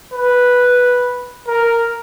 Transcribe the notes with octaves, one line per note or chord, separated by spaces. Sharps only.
B4
A#4